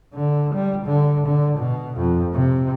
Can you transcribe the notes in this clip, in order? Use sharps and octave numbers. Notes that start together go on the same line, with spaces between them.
D3
G3
D3
D3
B2
F2
C3